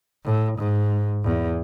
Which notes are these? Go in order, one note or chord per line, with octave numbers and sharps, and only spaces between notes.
A2
G#2
E2